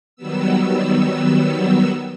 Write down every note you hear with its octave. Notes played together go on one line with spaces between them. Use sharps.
D#3 F#3 G3 B3 E6